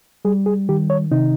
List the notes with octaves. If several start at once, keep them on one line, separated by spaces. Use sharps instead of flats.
G3 G#4
G#4
D#3 G4
C#5
C3 D#4